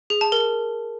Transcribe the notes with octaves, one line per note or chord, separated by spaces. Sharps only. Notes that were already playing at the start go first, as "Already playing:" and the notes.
G#4
A5
A#4